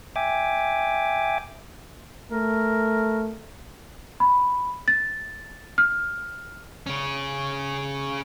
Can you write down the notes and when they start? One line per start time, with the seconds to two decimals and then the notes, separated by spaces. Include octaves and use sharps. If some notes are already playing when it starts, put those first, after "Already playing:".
0.16 E5 G5 G#5 D6
2.32 A3 A#4
4.20 B5
4.88 A6
5.78 F6
6.87 C#3 C#4